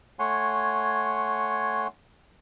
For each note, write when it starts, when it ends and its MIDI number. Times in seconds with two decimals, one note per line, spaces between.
0.19 1.87 57
0.19 1.87 73
0.19 1.87 78
0.19 1.87 80
0.19 1.87 84